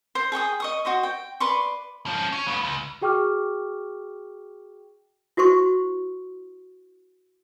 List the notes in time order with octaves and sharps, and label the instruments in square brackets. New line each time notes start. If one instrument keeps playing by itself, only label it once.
[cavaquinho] C5
G#4 G5 C#6 D#6
D#5 C#6 D#6
F#4 C5 D#5
G5
B4 D5 C6 C#6
[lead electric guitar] F3 C#4
C#4
B3 F4
C#2
[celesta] F#4 G#4 G5 C#6 D6 F6
[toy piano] E4 F#4 C5 C6 C#6